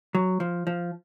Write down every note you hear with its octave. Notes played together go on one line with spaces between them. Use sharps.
F#3
F3
F3